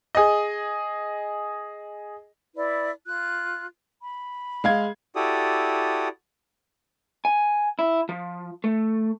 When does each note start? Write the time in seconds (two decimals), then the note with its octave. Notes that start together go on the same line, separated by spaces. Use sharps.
0.15 G#4 D#5
2.55 E4 B4 D5
3.06 F4 F#6
4.01 B5
4.64 G#3 F5 G#6
5.16 E4 F#4 G4 A4 D5 D#6
7.25 G#5
7.79 E4
8.09 F3
8.64 A3